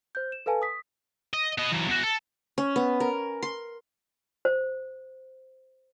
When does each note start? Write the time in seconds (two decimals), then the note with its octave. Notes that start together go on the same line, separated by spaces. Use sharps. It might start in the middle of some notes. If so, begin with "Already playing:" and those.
0.15 C5 G6
0.32 E7
0.46 A4 B4 F5 G#5 A5
0.62 D#6 B6
1.34 D#5
1.58 B3 D#5
1.72 E3 F#3
1.88 E2 F#4
2.04 A4
2.58 C#4
2.76 B3
3.00 A#4
3.43 C6
4.45 C5